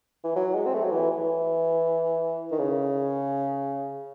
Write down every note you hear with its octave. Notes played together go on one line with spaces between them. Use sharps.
E3
F#3
G#3
C4
A3
F#3
E3
E3
D#3
C#3